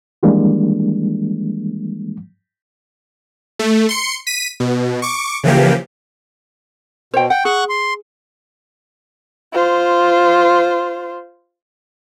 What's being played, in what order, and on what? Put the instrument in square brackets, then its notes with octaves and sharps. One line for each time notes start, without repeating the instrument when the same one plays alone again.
[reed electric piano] D#3 E3 G3 G#3 A#3 D4
[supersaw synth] A3
C6 C#7
B6 D#7
B2
C#6 D6
C#3 E3 F3 A#3 G4
[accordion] B2 [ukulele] C5 C#5 G5
[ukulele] F#5 [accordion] G5
[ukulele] G#4 [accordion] F#5 C#6 F#6
[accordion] C6
[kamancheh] F4 C5